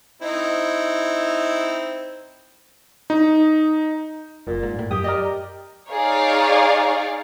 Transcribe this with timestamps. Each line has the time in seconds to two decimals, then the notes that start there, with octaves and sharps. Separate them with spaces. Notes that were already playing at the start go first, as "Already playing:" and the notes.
0.22 C4 D#4 E4
3.10 D#4
4.47 F#1 A#2
4.63 G#2
4.79 A2
4.91 F#2 G4 D#6
5.04 A#4 D5 D#5
5.91 D#4 G#4 C#5 D5 F5